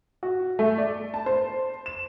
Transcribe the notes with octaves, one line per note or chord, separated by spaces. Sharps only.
F#4
A3
D5
A5
C5
E7